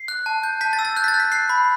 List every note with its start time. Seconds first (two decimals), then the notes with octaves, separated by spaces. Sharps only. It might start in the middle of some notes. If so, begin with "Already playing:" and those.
Already playing: C7
0.08 F#6
0.26 A5
0.43 G6
0.61 A5 B6
0.73 A6
0.79 E6
0.85 A6
0.96 F#6 G6
1.04 B6
1.08 A6
1.14 F#6
1.20 B6
1.32 F#6 C7
1.49 B5